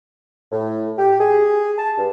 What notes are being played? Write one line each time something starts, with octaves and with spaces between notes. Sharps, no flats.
A2
G4
G#4
A5
G2